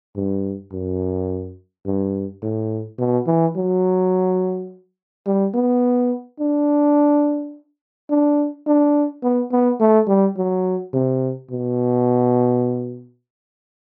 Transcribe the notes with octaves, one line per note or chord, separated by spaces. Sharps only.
G2
F#2
G2
A2
B2
E3
F#3
G3
B3
D4
D4
D4
B3
B3
A3
G3
F#3
C3
B2